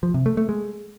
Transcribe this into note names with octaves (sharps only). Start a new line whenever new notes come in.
F3
C3
A3
A3
G#3